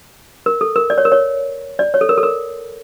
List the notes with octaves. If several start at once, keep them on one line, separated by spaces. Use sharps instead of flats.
A#4
A4
A#4
D5
C#5
A#4
C#5
D5
C#5
A4
A#4
A4
A#4